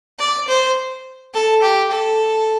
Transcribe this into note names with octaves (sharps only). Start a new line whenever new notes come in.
D5
C5
A4
G4
A4